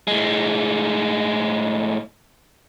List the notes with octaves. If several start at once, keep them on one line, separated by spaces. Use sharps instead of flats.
A2 G#3